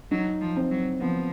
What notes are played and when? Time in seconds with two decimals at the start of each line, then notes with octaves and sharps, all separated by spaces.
0.11 F#3 D#4
0.41 F3
0.57 C4
0.71 F#3
1.01 F3 B3